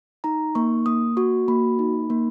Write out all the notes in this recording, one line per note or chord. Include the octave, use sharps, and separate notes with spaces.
D#4 A#5
A#3 C#6
A#3 D#6
F#4 C#6
A#3 B5
D#4
A#3